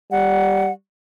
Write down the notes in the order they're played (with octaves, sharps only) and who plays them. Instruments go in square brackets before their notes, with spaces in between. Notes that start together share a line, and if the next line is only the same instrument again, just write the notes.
[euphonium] G3 [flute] F#5